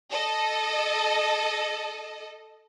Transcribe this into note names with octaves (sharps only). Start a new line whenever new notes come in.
A4 D#5